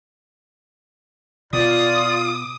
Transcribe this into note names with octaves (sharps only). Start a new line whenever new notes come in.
B2 F4 D5 D#6